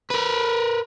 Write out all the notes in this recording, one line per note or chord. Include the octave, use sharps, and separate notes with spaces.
A#4 B4